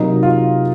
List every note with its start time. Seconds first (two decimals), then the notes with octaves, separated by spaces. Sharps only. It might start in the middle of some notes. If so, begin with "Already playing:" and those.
Already playing: C3 F#3 A#3 D#4
0.23 F4